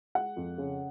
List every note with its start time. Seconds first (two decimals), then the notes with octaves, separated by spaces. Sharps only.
0.15 G#3 F#5
0.37 F2
0.58 C#3